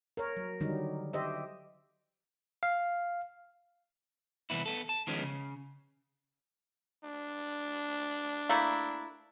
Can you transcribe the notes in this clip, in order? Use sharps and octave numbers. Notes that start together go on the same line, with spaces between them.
A#4 C#5
F#3
D3 D#3 F#3 G3 D#4
G4 C5 D#5 E5
F5
C2 F#2 E3 B3 E4
B3 A4
A5
D#3 F3 G#3 B3 C#4
C#3
D4
A3 A#3 E4